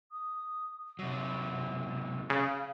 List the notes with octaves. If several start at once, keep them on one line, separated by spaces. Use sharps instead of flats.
D#6
C3 F#3 F#5
C#3 F5